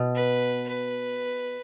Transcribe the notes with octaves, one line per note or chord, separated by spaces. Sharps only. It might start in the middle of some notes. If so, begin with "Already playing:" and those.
Already playing: B2
B4
B4